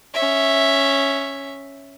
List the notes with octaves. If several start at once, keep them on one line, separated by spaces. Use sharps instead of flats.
C#4 E5